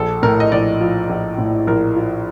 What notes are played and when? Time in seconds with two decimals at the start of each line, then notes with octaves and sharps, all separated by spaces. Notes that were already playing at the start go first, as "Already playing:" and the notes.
Already playing: A#1 A4
0.23 A2 A#4
0.40 D#5
0.52 A#1 D5
0.81 F3
1.09 A#1
1.38 A2
1.67 A#1 A#4
1.96 F3